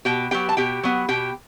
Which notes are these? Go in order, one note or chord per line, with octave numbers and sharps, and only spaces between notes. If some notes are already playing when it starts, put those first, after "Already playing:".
B2 G4 G5
F#3 B3 G4 G5
A5
B2 G4 G5
F#3 B3
B2 G4 G5